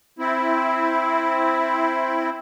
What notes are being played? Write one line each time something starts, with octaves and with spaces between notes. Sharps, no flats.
C4 E4